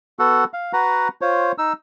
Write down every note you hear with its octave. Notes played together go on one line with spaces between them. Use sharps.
B3 F#4 A4 F#5
F5
F#4 B4 F#5 A#5
F4 C5 C#5
D#4 E6